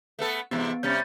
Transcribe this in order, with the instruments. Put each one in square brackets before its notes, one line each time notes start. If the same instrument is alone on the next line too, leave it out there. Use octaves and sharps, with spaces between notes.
[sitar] A3 B3 A4
[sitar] E2 G#2 C3 [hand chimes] B3
[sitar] C3 G3 C#4 [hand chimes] G6 A6